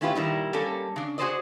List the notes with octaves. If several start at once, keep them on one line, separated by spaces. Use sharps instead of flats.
A3 C#4 E4 F4 G4 B4
A#2 D#3 G3 E4
G3 A#3 C#4 A4
C#3 D4
F#4 G#4 A4 C5 D5 D#5